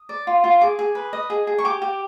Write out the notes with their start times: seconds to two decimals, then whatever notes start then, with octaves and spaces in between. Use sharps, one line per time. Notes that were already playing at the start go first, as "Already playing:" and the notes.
Already playing: D#6
0.09 D5
0.27 F4
0.44 F4
0.61 G#4 D6
0.79 G#4
0.95 B4
1.13 D#5
1.30 G#4
1.47 G#4
1.58 C#6
1.64 G4 D6
1.82 G4